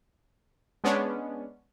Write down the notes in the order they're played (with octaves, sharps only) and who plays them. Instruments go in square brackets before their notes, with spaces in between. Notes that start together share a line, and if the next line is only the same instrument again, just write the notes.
[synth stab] G#3 B3 C#4 D4